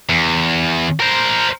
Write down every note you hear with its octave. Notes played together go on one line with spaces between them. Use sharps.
E2
A#4 C5